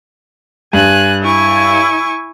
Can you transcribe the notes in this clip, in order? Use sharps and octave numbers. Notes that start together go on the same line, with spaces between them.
G2 G#5 F#6
E4 G#5 C#6